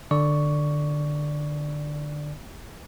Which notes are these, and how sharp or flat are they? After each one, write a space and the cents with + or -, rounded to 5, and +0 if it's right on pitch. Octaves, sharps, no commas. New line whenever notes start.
D3 +20 D5 +0 C#6 +10